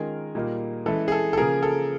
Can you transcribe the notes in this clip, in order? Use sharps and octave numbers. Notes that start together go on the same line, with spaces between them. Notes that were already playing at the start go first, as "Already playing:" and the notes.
Already playing: D#3 G#3 C#4 F4 G#4 A#4
A#2 G3 A#3 D#4
E3 G#3 C#4 E4 A4
G#4
A4
A4
C#3 F3 A#3 G#4 A#4
A4